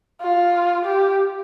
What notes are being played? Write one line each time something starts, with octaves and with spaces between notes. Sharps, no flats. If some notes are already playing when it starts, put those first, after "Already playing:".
F4
G4